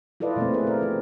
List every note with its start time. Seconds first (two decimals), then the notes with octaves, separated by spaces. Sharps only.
0.20 E4 F4 A4 B4 D5 D#5
0.36 B2 F3 A3 A#3 C4
0.54 E4 G#4 B4
0.67 A#4 D5
0.81 F3 C4